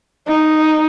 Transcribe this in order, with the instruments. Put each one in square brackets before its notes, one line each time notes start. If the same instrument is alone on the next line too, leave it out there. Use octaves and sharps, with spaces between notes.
[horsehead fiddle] D#4